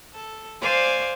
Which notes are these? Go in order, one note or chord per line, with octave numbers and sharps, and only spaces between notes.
A4
C5 D5 F5 G#5